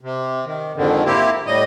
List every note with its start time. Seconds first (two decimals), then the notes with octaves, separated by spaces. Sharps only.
0.01 C3
0.45 D#3
0.76 F2 G#2 D3 D#3
1.06 A#3 C4 E4 G4
1.47 A2 G3 D#5